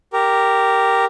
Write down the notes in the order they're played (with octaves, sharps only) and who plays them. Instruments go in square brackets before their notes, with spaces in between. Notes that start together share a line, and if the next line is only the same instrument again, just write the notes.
[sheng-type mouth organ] G4 A#4